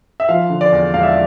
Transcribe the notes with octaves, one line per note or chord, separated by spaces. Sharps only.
E5
F3 F5
D3
D5
E2
E1 F5
E5